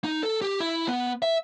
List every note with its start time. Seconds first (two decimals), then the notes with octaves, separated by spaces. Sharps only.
0.04 D#4
0.23 A4
0.42 G4
0.60 E4
0.88 B3
1.22 E5